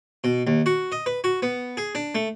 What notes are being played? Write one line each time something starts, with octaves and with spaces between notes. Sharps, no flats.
B2
D#2
F#4
D#5
B4
F#4
B3
G#4
D4
A3